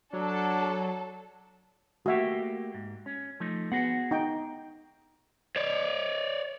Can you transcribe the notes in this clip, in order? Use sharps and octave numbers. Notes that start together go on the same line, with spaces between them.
F#3 D4 A4
A3 A#3 F#4 G4 E5
G#2
C#4
F3 A3 D#4
B3 F#4 G#4 F#5
D#4 G5
C#5 D5